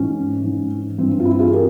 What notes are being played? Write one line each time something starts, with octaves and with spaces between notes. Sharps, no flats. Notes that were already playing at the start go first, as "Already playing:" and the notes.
Already playing: G#2 E3 C#4
G#2 E3
G2 E3 C4
C4
F4
C4 E4
F4 G#4
G4 A#4